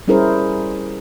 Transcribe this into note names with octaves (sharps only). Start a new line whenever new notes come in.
G3 C#4 E4 G#4 A#4 C5